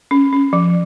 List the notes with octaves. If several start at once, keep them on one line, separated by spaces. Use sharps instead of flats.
C#4
C#4
F3